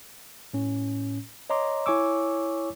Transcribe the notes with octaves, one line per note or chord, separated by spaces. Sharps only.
A2 C#4
C#5 D#5 A#5 C6 D6
E4 C#5 G#5 C#6 D6 E6